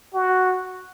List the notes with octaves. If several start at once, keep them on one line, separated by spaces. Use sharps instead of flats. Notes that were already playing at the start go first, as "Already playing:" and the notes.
F#4